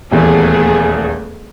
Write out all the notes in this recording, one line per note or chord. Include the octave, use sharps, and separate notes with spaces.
D#1 E2 A3 B3 G#4